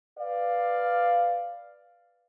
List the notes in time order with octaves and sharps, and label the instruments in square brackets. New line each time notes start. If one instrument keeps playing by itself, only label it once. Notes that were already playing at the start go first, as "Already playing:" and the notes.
[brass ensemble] B4 D5 F5